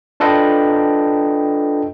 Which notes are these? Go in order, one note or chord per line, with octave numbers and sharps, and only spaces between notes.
D4 F4 A4 B4 D#5 G5